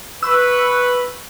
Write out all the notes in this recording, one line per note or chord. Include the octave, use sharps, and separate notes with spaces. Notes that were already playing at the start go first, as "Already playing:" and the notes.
B4 C#6 E6